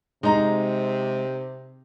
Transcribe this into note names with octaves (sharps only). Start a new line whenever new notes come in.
C3 G#3 D#4 A#5